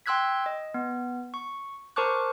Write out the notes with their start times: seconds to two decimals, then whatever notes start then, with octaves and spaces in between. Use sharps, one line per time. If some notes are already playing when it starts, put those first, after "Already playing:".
0.06 G5 C6 E6 F#6 G#6 B6
0.46 D#5
0.74 B3
1.34 C#6
1.96 A#4 C5 A5 C#6 D6 F#6